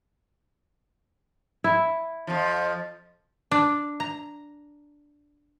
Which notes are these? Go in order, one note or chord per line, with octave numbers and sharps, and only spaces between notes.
E4
F2 F3
D4
A#5